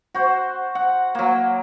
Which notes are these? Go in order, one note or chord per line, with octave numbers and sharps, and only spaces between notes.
F#4 C5
F#5
F#3 A#3